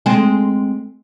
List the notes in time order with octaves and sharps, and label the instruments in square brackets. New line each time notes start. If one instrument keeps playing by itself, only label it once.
[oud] G#3 C4